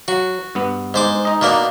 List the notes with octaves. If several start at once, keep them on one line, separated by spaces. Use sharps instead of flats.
F#3 F#4
G2 B3
G#2 C5 D6
D#4 D#5
B2 A#3 D4